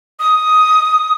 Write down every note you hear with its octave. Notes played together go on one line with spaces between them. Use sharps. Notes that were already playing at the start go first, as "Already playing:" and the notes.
D#6